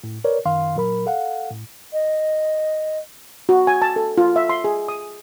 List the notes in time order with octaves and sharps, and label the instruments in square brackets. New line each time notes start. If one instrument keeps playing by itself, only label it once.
[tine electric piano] A2
A#4 B4 C#5 D5
F#2 D#3 F5 C6
A#2 F#3 A#4 B5
A4 F5 F#5
A2
[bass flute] D#5
[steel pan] F#4
G#5
A5
A4
F4
E5
C6
G#4
D#6